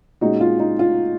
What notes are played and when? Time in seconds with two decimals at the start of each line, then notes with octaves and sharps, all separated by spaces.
0.21 A#2 G#3 C#4 D#4 F#4
0.41 F4
0.60 D#4
0.79 F4